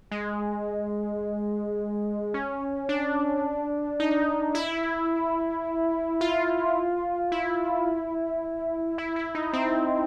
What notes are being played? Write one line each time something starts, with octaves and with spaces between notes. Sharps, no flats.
G#3
C#4
D4
D#4
E4
F4
E4
E4
E4
D#4
C4